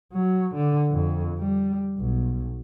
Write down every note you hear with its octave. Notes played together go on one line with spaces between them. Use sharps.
F#3
D3
F2
G3
B1